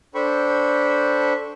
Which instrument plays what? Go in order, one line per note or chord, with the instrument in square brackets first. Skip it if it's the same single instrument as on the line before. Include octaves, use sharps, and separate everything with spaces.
[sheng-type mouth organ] D4 A4 C5 G5 B5 C#6